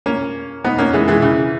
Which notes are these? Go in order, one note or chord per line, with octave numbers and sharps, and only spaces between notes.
A#3 C#4
B3 D#4
A#3 C#4
E3 G#3
E3 G#3
C#3 E3